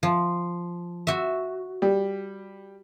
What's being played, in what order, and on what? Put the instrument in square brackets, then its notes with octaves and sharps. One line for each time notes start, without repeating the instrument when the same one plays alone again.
[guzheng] F3
F#4 E5
[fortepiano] G3